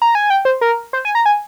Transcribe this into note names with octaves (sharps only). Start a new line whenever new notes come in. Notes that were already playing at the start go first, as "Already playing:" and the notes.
A#5
G#5
G5
C5
A#4
C5
G#5
A#5
G#5